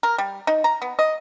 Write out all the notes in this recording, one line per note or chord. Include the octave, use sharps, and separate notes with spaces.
A#4
G3
D#4
A#5
B3
D#5